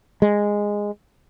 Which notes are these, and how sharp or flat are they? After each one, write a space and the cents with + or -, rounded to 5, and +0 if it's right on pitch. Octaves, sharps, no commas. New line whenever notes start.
G#3 -10